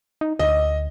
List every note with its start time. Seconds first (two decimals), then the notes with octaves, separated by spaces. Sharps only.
0.21 D#4
0.39 D2 D#5